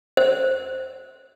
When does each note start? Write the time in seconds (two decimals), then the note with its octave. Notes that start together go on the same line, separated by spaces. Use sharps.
0.17 C5